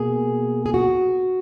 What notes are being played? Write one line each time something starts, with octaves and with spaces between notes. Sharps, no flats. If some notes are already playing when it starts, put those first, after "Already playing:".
Already playing: B2 A#3 G#4
G#4
F#4